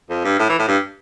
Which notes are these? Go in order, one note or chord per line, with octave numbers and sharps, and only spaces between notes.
F2
G2
A2
E3
A2
G2